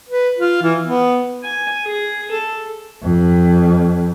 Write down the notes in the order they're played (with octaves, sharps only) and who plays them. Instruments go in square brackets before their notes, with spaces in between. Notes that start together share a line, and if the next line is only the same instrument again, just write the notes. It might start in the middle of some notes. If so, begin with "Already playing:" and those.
[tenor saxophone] B4
F4
E3
B3
[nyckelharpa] G#5
G#4
A4
[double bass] F2